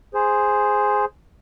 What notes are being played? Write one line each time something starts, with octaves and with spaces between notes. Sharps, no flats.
G#4 C5